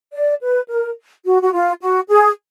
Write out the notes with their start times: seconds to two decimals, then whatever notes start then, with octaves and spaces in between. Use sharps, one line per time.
0.12 D5
0.41 B4
0.69 A#4
1.25 F#4
1.42 F#4
1.53 F4
1.81 F#4
2.09 G#4